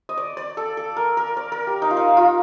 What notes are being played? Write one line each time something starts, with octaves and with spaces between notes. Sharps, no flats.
D#5
D5
D5
A4
A4
A#4
A#4
D5
A#4
G4
D#4
F4
D#4
F4